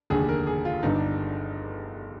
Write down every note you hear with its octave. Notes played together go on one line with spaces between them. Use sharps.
F1 D#2 D3 G#4
A#4
G#4
F4
G1 G2 D3 D#4
D4